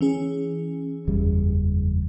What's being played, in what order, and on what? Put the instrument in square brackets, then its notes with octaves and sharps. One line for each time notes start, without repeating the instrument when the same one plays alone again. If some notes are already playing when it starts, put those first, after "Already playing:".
[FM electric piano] E3 C#4 G#4
[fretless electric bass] F#1 E2 G3